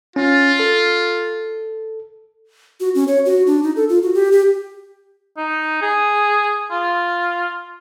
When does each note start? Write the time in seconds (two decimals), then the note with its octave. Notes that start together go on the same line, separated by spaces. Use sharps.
0.16 C#4 F4
0.60 A4
2.80 F#4
2.95 C#4
3.08 C#5
3.26 F#4
3.47 D4
3.63 D#4
3.76 A4
3.89 F4
4.03 F#4
4.14 G4
4.32 G4
5.37 D#4
5.82 G#4
6.71 F4